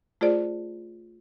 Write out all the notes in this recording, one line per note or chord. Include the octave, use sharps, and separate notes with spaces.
A3 F4 G#4 C5 D5